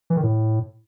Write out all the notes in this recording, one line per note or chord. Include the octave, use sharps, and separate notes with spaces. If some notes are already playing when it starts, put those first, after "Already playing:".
E3
D#3
A2